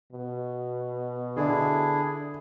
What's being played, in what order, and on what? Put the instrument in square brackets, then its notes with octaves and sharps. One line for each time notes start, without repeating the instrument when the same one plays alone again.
[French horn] B2
[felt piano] D3 [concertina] D4 E4 G#4